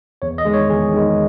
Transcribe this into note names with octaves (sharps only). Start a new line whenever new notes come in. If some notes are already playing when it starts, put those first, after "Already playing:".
E2 C#5
D#5
D#3 G#3
C#5
E2 G#4
D#3 G#3